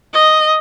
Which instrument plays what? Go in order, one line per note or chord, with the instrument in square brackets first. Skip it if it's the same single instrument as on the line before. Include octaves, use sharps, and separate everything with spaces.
[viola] D#5